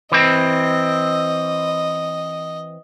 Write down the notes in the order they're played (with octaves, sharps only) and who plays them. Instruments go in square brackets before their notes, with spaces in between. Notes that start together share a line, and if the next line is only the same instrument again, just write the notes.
[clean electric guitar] E3 C4 [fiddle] D#5